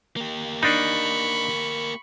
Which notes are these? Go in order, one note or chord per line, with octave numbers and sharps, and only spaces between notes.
A#3 G4
D4 D#4 B5 C#6